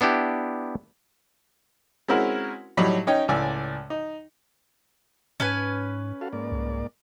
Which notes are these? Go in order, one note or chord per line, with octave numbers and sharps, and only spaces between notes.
B3 D4 E4 G4
G#3 C4 C#4 E4 F#4 A#4
A2 F#3 G3 D#4 B5
C#4 D#4 C#5 G5
C#2 A2 D5 G#5 E6
D#4
G#2 C#4 B4 G#5
F#4 A4 F5
G#2 A#3 D5
C2